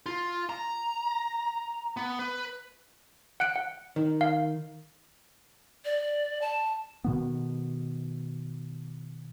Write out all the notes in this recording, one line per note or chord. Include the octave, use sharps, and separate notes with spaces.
F4
A#5
B3
B4
F#5 F#6 D7
F#5
D#3
F5
D5
A5
B2 D#3 B3